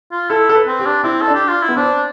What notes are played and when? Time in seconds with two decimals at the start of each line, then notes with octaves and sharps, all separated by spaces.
0.12 F4
0.30 E4 A4
0.49 A4
0.55 B4
0.67 C4
0.79 G4
0.86 D4
1.03 C4 E4
1.22 A4
1.28 D4
1.35 G4
1.48 F4
1.63 E4
1.69 B3
1.76 C4 D4